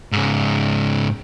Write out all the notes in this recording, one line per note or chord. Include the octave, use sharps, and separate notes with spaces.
G#2 C#3